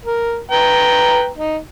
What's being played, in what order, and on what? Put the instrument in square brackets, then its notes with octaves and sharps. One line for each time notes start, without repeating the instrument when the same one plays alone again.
[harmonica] A#4
B4 G5 A#5
D#4